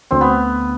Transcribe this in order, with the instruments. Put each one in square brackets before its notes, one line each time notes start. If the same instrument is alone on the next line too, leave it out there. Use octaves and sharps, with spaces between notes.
[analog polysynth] D2 [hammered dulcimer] C4
[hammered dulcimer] B3